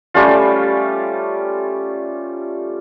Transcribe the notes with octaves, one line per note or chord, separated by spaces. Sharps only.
G3 A3 C#4 F4